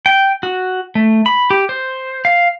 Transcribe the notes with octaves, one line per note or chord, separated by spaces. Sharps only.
G5
F#4
A3
B5
G4
C5
F5